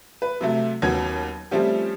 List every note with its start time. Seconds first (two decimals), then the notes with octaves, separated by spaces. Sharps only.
0.22 B4
0.41 C3 F#3 A3
0.82 D#2 F#3 B3 C#4 G#6
1.51 F3 G3 A3 C4 C#4 G4